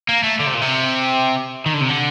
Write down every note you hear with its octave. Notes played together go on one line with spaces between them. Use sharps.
A#3
A3
D3
C3
A#2
C3
D#3
D3
C3
D3